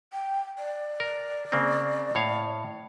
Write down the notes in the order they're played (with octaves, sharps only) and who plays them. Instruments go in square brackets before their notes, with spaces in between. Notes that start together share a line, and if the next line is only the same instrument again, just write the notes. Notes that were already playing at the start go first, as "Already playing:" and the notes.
[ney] G5
D5
[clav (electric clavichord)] A#4
C#3 A#3 C4
A2 C#5 F5